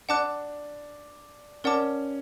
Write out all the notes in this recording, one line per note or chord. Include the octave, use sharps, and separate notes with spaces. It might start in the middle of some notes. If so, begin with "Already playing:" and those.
D4 F#5 A5 D6 F#6
C#4 A#4 D5 F#5 A5 D6